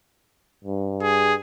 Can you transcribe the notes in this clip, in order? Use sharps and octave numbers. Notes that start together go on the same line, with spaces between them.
G2
G#4